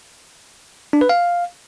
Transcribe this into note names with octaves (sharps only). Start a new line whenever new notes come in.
D4
B4
F5